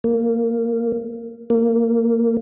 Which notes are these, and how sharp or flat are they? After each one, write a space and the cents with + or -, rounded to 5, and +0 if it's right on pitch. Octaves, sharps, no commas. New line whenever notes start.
A#3 -10
A#3 -15